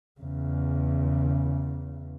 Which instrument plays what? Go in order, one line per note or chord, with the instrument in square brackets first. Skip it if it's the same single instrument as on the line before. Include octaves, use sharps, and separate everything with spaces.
[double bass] E2 C#3